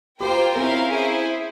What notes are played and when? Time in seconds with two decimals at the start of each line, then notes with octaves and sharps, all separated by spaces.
0.20 A#3 F4 G4 C5 G5
0.55 C4 C#4 E4 A#4 F5
0.91 E4 G#4 C5